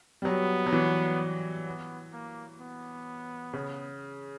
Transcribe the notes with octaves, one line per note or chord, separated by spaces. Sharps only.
G3
F#3 B3
F#3
E3
B3
A#3
B3
C#3